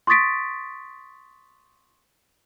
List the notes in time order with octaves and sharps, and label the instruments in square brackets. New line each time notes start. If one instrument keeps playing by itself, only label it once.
[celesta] C6 C#6 D#6 A6 B6 D7